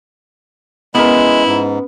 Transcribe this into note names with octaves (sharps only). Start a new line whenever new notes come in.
G#3 B3 C#4 E4 A#4 B4
G#2